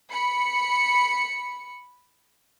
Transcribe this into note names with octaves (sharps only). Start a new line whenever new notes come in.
B5 C#7